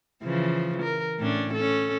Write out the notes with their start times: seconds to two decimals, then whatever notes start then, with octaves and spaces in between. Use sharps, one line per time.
0.23 C#3 E3 F3
0.83 A#4
1.19 A2 C#4 D4
1.54 C#4 A4